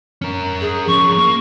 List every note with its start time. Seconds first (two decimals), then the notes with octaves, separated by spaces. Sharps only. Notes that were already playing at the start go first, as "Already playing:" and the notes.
0.22 C#4 A#4
0.61 G#4
0.87 F3 C#4 C#6
1.18 A#3 C#6